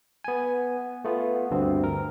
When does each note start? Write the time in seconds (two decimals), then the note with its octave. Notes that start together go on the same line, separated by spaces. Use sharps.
0.24 B3 G#5
1.04 A3 B3 F4
1.51 D2 G2 C4
1.84 A#4